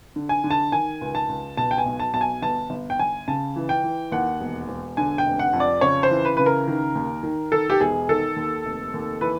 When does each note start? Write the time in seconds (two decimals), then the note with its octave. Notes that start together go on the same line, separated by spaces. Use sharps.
0.16 D3
0.29 G#5
0.44 D3
0.51 A5
0.72 D#3 G#5
1.01 C#2
1.15 A5
1.29 C#2
1.57 B2 A5
1.71 G5
1.78 G#5
1.86 B1
2.00 A5
2.14 B1 A5
2.21 G#5
2.42 G1 A5
2.70 G1
2.90 G5
2.99 G1 G#5
3.28 C#3 A5
3.56 E3
3.69 G5
3.83 E3
4.12 D#2 F#5
4.40 E1
4.68 E1
4.97 D3 G#5
5.18 G5
5.26 F1
5.39 F#5
5.53 F2
5.60 D5
5.81 C#3 C#5
6.03 C5
6.11 E3
6.25 B4
6.37 C#3 B4
6.46 A#4
6.68 D#3
6.95 D#2
7.23 D#3
7.52 D#3 A4
7.70 G4
7.80 E1 G#4
8.09 D#3 A4
8.36 D#2
8.65 F1
8.94 D#2
9.21 E3 B4